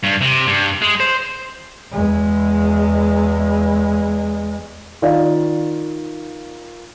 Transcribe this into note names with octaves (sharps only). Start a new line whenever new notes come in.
G2
C3
G2
G#3
C5
E2 G#3
D#3 F4 D5